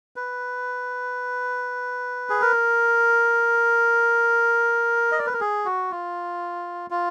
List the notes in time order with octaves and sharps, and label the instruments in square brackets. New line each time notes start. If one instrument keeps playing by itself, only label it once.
[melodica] B4
G#4
A#4
D#5
D5
B4
A#4
G#4
F#4
F4
F4